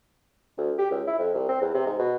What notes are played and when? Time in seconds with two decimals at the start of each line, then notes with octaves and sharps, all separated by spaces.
0.58 D2
0.79 G4
0.91 C#2
1.07 E4
1.19 F2
1.34 C2
1.49 C4
1.62 E2
1.74 C3
1.86 G#2
1.99 B2